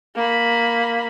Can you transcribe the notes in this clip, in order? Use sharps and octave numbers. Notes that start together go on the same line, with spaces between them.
A#3 B5